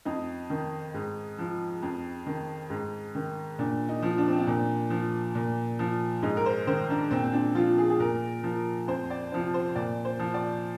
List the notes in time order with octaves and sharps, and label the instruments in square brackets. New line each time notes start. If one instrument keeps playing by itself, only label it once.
[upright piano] F2 D#4
D#3
G#2
F3
F2
D#3
G#2
D#3
A#2 D4
D#4
F3
D4
C4
D4
A#2
F3
A#2
F3
G#2 D#4
A#4
C5
D#3 C5
D4
A#2 C4
C4
D4
F3 F4
G#4
G#4
A#2 A#4
F3
F2 C5
D5
C3 F3 C5
C5
A#2 D5
C5
F3
D5